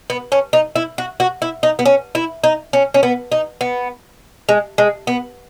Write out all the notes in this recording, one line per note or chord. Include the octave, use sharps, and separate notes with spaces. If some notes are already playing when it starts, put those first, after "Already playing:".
B3
C#4
D#4
E4
F#4
F#4
E4
D#4
B3
C#4
E4
D#4
C#4
C#4
B3
D#4
B3
G#3
G#3
B3